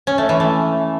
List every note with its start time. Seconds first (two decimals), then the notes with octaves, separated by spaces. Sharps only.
0.07 C#4
0.18 A3
0.29 E3
0.40 A3